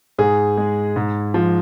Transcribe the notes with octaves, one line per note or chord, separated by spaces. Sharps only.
G#2 G#4
G#3
G#2
F3